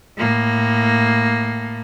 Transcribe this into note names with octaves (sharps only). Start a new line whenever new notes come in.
A2 A#3